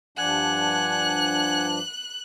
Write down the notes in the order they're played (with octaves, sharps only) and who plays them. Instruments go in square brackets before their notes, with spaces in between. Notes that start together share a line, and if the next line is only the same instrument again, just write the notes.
[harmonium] G2 F3 D4 [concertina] F#5 G#5 [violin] F#6